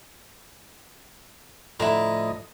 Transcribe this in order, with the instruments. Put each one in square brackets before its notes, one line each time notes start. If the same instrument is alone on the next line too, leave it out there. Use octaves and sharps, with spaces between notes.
[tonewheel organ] A2 F3 D#5 [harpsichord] D3 [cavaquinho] E4 A#5